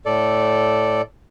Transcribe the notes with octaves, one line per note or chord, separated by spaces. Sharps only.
A2 A4 D5